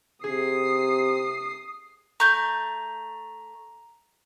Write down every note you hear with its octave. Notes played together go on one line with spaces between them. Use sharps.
C3 G#4 D#6 C7
A3 A#5 G6